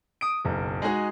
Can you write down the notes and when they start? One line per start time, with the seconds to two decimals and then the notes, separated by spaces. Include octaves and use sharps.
0.21 D#6 D7
0.45 F#1 B1
0.82 G#3 D#4 F#4 G#4